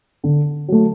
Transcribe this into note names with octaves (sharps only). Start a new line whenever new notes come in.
D3
F#3 A3